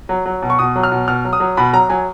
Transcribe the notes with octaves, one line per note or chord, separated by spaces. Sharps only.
F#3
F#3
B2
C#6
B2 D#6
F#3
F6
B2
B2 F6
F#3
D#6
F#3
B2 B5
F#3 A#5
F#3 G#5